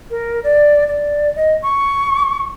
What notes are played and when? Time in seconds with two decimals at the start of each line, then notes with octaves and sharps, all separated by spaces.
0.10 A#4
0.44 D5
0.88 D5
1.36 D#5
1.62 C#6